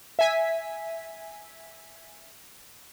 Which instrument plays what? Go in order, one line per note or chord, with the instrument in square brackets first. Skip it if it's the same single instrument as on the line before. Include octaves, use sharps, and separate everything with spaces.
[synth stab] E5 G#5 B6